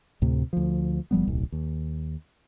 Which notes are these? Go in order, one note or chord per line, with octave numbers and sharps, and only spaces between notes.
D2 A2 C3
D2 F3
F#1 F3 G3 B3
D1 B1
D#2